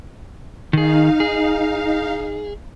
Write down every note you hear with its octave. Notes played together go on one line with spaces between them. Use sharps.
D#3 D#4 G#4 F5
G#4